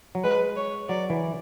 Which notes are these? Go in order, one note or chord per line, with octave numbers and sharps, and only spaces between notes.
F#3
G#3 B4
C#5
F#3 D5
E3